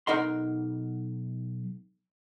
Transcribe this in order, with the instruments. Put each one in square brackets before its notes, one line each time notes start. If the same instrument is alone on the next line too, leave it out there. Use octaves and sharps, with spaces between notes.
[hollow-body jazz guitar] B1 D#4 A#4 D#5 F#5 C6